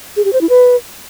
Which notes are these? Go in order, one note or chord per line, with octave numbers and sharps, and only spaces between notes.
G#4
G4
C5
E4
B4